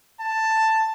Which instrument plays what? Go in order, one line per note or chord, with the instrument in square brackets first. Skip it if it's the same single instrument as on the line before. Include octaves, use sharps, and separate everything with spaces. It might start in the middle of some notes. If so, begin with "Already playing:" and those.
[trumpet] A5